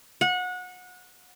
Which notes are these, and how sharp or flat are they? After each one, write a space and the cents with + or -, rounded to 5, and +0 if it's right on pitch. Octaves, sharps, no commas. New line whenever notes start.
F#5 -25